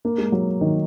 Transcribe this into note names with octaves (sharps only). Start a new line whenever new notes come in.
A#3
G#3
F#3
D#3